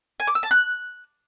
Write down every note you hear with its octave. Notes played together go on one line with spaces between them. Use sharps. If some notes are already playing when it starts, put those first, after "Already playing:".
G#5
D6
E6
A5
F#6